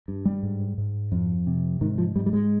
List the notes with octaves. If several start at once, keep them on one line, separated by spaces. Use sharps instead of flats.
G2
G3
G#2
G#2
F2
C3
G#2 D#3
F3
G#2 G3
G3
G#3